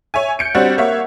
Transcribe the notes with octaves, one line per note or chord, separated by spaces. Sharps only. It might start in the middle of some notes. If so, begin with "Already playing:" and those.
C#5 E5 G#5
G6 C#7 D7
G3 C4 D4 F#4 C#5 F#5
A#3 C#5 E5 F#5